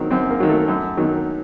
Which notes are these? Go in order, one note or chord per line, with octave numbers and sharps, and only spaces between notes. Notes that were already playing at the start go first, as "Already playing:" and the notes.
Already playing: D#3 F#3 C4
F#2 C4
A#3
D#3 F#3
A3
F#2
D#3 F#3